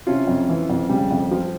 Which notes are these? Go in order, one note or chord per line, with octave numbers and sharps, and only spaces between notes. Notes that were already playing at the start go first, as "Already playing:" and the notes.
C3 C#4 F4
F2
E3
F2
C#3 G3
F2
F3